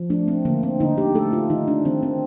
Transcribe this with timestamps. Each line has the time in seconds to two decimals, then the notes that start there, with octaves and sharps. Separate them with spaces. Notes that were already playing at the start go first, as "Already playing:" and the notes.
Already playing: F3
0.10 A3 D4
0.28 C4
0.45 D3 A#3
0.63 C4
0.80 D3 D#4
0.98 G4
1.15 A3 A4
1.33 F4
1.50 D#3 D#4
1.68 D4
1.85 D#3 C4
2.03 C4